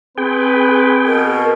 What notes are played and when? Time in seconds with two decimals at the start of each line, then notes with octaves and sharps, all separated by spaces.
0.18 C4 G#4 B4 G5
1.07 B2 A#4